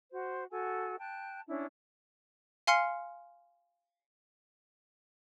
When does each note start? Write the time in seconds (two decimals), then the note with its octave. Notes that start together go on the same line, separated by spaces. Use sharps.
0.12 F#4 C5
0.51 F#4 A4 G#5
0.99 G5 A5 F#6
1.48 C#4 D4 E4
2.67 F5 G#5 C6 F6 C7 C#7